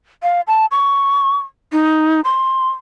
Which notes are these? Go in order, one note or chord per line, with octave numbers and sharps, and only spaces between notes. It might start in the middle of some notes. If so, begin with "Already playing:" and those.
F5
A5
C#6
D#4
C6